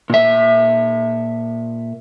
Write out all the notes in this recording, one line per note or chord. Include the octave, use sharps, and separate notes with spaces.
A#2 E5